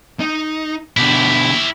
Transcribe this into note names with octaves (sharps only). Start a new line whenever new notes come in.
D#4
B2 D3 E4 G4